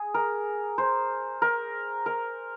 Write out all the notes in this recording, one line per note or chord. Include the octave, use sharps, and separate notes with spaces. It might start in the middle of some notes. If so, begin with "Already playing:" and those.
Already playing: G#4
A#4
C5
A#4
A#4